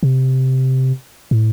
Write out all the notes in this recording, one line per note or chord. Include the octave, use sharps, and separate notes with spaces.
C3
A2